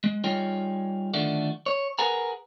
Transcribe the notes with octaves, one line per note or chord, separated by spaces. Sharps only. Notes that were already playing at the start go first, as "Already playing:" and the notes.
G#3
G3 D#4 F4 G#4 C#5 G5
D3 D#3 F3 A3 D4 F#4
C#5
G#4 A#4 B4 F#5 G#5 A#5